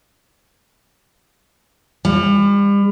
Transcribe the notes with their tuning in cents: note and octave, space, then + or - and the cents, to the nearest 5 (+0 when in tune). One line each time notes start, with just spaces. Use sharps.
G3 +40